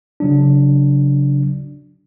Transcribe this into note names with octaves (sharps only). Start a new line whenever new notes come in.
C#3 F#3 D4